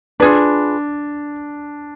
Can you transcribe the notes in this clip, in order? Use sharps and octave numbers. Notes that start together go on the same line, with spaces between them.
D4 F4 G#4 B4